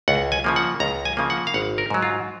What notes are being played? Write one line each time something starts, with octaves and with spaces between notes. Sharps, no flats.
C#2 F#5
G#5
C#3 F3 A#3
F#5
C#2 A#5
G#5
C#3 F3 A#3
F#5
F5
G#1 F#5
A#4
G#2 F#3
F4